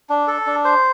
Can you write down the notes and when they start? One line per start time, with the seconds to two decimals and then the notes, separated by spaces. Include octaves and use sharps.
0.10 D4
0.28 A4
0.46 D4
0.65 C5